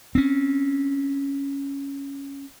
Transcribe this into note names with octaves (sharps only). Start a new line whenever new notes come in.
C4 C#4